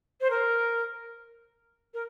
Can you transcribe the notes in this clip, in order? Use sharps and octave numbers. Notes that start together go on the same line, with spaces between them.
C5
A#4
A#4